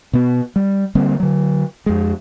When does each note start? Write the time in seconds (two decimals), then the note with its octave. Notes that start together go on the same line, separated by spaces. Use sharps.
0.13 B2 B3
0.56 G3
0.95 D3 G3 A#3 C4
1.20 D3 F#3
1.86 F2 G#3